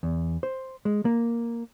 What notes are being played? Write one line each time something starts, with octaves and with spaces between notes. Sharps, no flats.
E2
C5
G#3
A#3